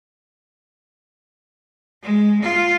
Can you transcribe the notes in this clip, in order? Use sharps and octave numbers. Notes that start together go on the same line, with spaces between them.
G#3
F4